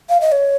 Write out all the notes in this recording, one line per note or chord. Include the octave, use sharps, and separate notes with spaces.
F5
D#5
C#5